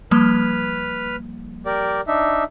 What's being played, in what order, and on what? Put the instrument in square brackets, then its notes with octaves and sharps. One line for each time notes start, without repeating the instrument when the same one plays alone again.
[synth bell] F3 G3 A#3 [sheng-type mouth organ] B4 F6
[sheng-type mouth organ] G4 A#4 D5
D4 D#4 E5